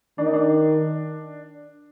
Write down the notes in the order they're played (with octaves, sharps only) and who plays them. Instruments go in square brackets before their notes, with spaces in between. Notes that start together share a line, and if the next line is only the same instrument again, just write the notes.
[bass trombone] D#3 [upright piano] D4
[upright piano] D#4
D4